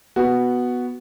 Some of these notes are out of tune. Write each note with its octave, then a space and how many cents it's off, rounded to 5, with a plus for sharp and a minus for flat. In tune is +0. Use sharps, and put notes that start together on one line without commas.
B3 +0 F#4 +0